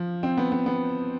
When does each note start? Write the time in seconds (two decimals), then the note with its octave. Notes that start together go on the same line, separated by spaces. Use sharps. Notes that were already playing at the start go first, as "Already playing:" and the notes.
Already playing: F3
0.23 C4
0.37 B3
0.52 B3
0.66 B3